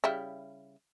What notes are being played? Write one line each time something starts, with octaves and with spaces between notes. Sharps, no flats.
C#3 G3 E4